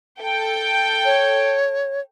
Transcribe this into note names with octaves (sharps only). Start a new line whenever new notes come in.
A4 G5
C#5